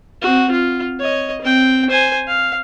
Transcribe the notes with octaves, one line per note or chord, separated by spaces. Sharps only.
C4 F#4
F4
C#5 D#5
C4 G5
C5 G#5
F5